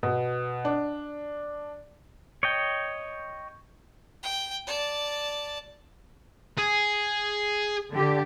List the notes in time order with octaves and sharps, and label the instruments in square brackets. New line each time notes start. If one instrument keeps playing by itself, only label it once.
[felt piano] B2
D4
[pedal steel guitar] C#5 D#5 G5
[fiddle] G5
D5 A5
[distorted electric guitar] G#4
[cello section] D3 G4